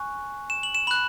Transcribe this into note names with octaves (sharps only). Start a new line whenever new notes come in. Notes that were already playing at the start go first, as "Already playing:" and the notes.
Already playing: G#5 C#6 F#6
E7
F#7
E7
B5 F#6 F#7